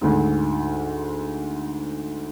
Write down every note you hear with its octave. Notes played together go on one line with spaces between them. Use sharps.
D2 G#2